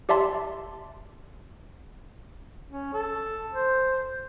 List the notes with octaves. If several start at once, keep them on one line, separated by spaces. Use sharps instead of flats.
G4 D5 E5 A5 C6
C#4
A4
C5